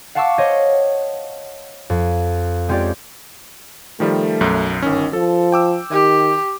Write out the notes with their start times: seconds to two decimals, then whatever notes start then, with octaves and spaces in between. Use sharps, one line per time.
0.15 F5 F#5 A5 C#6 D6 E6
0.38 C5 C#5 D#5
1.90 F2
2.69 G#3 C4 C#4 F4 G4 D5
4.00 D#3 F3 G3 A3
4.41 B1 F#2
4.82 G1 D#3 C#4
5.13 F3 A4
5.52 G5 D6 E6
5.91 D#3 G4